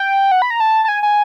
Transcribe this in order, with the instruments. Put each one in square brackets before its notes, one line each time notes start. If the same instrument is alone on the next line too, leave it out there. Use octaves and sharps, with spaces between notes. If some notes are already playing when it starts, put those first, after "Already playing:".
Already playing: [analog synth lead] G5
F#5
B5
A#5
A5
A5
G#5
G#5